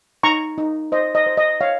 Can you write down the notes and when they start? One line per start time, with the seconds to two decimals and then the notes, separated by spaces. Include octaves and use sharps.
0.23 D#4 A#5 C#6
0.58 D#4
0.92 C5 D#5
1.15 D#5
1.26 C5
1.37 D#5
1.61 C#5 F5